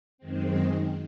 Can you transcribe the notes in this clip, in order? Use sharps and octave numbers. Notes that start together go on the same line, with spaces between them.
F#2 D#3 G#3 C4